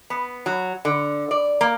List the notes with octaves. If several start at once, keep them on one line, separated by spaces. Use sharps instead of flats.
B3
F#3
D3
D5
A#3